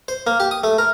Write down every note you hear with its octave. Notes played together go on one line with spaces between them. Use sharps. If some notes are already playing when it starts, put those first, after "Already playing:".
C5
A#3
G4
D#6
A3
A#4